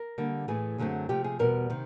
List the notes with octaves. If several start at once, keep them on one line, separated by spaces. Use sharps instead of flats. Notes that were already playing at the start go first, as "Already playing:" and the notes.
Already playing: A#4
D3 G3 A#3
A2 E3 A3 G#4
F#2 D3 F#3 A3 C4
C3 F3 A3 G4
G#4
E2 B2 G3 B3 A#4
C3 D#3